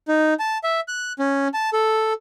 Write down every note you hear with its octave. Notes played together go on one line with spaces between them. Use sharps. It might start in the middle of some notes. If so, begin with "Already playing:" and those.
D#4
A5
E5
F#6
C#4
A5
A4